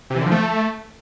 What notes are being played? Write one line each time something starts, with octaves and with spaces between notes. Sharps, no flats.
C3
E3
D3
F3
A3